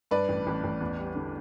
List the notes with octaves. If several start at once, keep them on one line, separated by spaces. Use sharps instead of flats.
G2 B4 D5
A1
A1
A1
E2
G3
D3